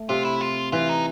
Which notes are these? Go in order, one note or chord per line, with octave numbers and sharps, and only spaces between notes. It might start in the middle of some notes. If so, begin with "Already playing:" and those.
Already playing: A3
C3 F4
E4
F4
E3 F4
D#4